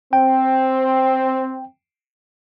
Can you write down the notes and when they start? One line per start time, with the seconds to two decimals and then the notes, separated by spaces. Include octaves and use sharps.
0.13 C4 G5